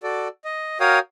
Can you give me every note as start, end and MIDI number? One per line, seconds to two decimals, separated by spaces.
0.03 0.28 66
0.03 0.28 69
0.03 0.28 74
0.45 0.78 75
0.80 0.99 66
0.80 0.99 70
0.80 0.99 73
0.80 0.99 77
0.80 0.99 79
0.80 0.99 87